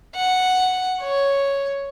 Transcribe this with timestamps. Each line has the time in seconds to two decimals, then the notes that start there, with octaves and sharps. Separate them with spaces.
0.15 F#5
1.01 C#5